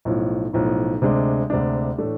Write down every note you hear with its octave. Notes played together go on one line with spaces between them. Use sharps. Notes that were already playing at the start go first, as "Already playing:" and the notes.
B1 A2 F3
B1 A2 F3
D2 C3 G#3 D4
D2 C3 G#3 D4
A2 E3 A3 D4